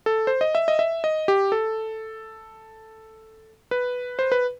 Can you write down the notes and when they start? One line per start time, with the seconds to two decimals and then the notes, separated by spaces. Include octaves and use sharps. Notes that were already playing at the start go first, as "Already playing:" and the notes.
0.06 A4
0.27 C5
0.41 D#5
0.55 E5
0.68 D#5
0.79 E5
1.04 D#5
1.28 G4
1.52 A4
3.71 B4
4.19 C5
4.32 B4